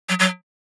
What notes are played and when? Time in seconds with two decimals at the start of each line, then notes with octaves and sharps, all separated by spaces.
0.09 F#3
0.20 F#3